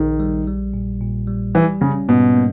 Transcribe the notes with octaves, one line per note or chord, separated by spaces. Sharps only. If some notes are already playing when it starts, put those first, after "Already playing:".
Already playing: A#1 D#3
G3
G3
A#2
A#2
G3
E3 G3
C#3 C#4
G#2 B2
A#3